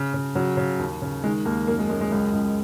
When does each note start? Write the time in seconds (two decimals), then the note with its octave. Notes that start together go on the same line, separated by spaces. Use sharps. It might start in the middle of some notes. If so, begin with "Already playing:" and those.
Already playing: C#3
0.14 C#3
0.35 C#3 F#3
0.57 C#3
0.79 D#2
1.02 C#3
1.24 D#3 G#3
1.45 D#2 A#3
1.67 F#2 A#3
1.79 G#3
1.89 F#2 G#3
2.01 G#3
2.12 C#2 G#3
2.33 C#2